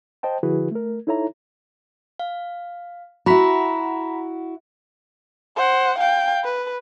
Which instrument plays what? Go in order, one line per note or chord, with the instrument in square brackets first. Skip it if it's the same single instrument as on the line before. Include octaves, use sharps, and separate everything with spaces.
[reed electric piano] C5 D#5 G5 A5
D3 F3 E4 F#4 G#4 B4
A3 A#4
D#4 E4 A4 C#5 E5 A#5
[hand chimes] F5
[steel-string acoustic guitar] E4 F#4 [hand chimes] A#5 B5 B6
[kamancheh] C5 F#5
F5 G5
B4